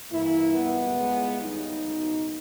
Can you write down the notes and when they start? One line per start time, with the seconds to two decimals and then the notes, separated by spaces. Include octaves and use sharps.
0.10 G2 E3 A#3 E4
0.53 C#2 B2 G3 B3
0.97 C#2 C#3 G#3
1.40 D#2 C#3 G3 D#4
1.84 C#2 B2 A#3